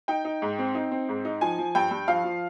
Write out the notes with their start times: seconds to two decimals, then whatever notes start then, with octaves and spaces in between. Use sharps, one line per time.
0.08 D#4 G5
0.25 D#4
0.42 G#2
0.59 C4
0.75 D#4
0.91 C4
1.09 G#2
1.25 D#4
1.41 F3 G#5
1.58 F3
1.75 G2 G5
1.91 G2
2.08 F3 F5
2.24 F3